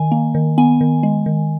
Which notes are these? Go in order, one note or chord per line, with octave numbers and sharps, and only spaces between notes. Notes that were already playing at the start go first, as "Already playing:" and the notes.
Already playing: D#3 G#5
A#3
D#3
B3 G#5
D#3
G#3
D#3